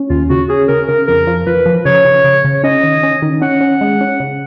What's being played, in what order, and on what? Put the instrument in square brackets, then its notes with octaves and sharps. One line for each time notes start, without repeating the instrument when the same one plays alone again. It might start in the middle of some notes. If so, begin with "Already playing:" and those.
Already playing: [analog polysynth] C#4
[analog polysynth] D#2 [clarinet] F4
[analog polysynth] C#3 [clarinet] F#4
[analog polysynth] C#4 [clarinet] G#4
[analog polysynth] C#3 [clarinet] A#4
[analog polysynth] C#3 [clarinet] A#4
[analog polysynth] F2 [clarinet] A#4
[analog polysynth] F3
[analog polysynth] F3 [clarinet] B4
[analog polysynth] F3
[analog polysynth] C#3 [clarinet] C#5
[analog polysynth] C#3
C#3
C#3
[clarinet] C#5
[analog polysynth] C#4 [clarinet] D#5
[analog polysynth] D#3
C#4
D#3
[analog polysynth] C#4 [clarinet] F#5
[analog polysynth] C#4
G#3
C#4
C#3